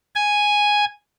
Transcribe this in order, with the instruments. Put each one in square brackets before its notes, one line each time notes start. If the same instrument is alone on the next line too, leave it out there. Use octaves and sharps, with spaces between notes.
[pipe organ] G#5